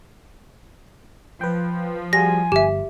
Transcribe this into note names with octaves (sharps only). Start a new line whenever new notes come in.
F3 B4 G5
G3 F#4 G#4 G#5 A#6
G1 G4 E5